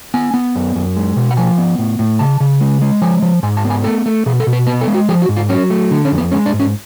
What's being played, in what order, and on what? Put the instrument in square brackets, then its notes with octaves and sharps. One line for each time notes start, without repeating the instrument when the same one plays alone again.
[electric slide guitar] B3 G#5
B3
F#2
F#2
G#3
B2
F#5
F3 G#5
B3
A2
A2
C#3 A5
C#3
G#3
G#3
F3 G#5
F3
G#2 G#5
A5
B3
G#5
A3 A4
A3
B2 G#4
A4
B2
B4
B3 B4
A4
G#3
F#4
F3 G#4
F#4
G#2
F4
F#3 C#4
A3
D3
C#4
F2
B3
G#3 C#4
D4
G#2
C#4